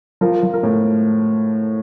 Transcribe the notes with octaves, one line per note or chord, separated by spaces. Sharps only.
F3 A#4
F3
A#4
A2